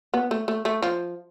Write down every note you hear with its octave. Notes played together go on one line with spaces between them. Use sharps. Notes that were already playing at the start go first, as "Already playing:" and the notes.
B3
A3
A3
A3
F3